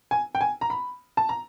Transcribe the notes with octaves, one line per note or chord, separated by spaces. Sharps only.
G#5
G5
G#5
A#5
B5
A5
A#5